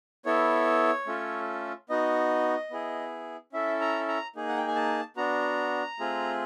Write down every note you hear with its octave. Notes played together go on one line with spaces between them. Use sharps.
B3 E4 A4 C#5
A3 C#4 F4 A4
B3 D#4 F#4 D#5
B3 E4 G#4
C#4 E4 A4 E5
A#5
A#5
A#3 D#4 G#4
F#5
G5
G#5
A5
B3 D4 F#4 A#5
A3 C4 F4 G#4